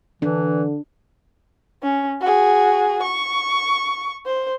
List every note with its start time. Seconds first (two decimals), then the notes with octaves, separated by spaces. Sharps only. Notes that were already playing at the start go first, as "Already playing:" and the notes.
0.22 D3 E3 D4
1.83 C#4
2.21 F#4 G#4
3.02 C#6
4.26 C5